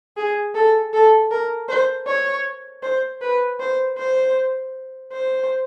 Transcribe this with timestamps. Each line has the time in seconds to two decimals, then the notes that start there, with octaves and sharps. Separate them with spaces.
0.17 G#4
0.55 A4
0.93 A4
1.31 A#4
1.69 C5
2.07 C#5
2.83 C5
3.21 B4
3.60 C5
3.98 C5
5.12 C5